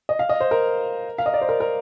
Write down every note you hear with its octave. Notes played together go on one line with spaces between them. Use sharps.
D#5
F5
D#5
C5
A#4
F5
D#5
D5
C5
A#4
A#4